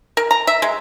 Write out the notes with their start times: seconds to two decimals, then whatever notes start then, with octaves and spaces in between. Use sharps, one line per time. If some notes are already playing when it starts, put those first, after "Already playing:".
0.17 A#4
0.31 A#5
0.47 E5
0.62 G#3